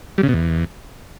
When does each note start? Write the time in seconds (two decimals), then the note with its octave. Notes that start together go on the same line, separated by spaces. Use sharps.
0.18 G3
0.23 C#3
0.28 B2
0.34 E2